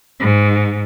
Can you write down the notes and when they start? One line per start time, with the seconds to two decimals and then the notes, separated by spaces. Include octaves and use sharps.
0.20 G#2